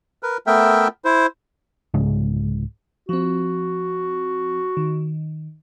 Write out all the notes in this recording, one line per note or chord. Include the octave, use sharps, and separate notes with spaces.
A#4 B4
A3 B3 A#4 E5 G5
E4 C5
C2 G#2 C#3 G#3
F3 C4 F#4
D#3